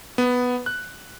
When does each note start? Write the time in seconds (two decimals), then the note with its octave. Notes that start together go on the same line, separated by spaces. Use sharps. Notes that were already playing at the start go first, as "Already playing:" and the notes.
0.18 B3
0.66 F#6